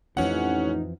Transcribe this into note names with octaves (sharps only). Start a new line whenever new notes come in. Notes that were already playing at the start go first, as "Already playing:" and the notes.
A1 F2 E3 F3 C#4 D#4 F#5